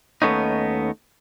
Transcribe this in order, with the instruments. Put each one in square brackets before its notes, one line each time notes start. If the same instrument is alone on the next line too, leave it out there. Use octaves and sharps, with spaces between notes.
[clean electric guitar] D#2 A3 B3 C#4 D#4